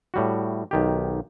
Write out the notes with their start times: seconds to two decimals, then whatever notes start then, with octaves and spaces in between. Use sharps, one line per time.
0.14 A2 G3 F#4
0.71 B1 D#3 G4